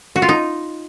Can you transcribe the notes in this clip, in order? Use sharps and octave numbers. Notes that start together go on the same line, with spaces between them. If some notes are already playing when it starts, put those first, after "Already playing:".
F#4
F4
D#4